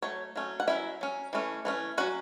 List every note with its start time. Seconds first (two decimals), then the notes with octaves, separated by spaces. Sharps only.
0.02 F#3 A3 C#5
0.36 F#3 A3 C#4
0.60 F#5
0.67 F#3 C#4 E4 E5
1.01 F#3 C#4
1.33 E3 A3 C#4
1.65 E3 A3 C#4
1.98 F#3 C#4 F#4 F#5